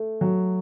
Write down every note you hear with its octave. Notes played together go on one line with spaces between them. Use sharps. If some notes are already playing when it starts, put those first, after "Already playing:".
Already playing: A3
F#3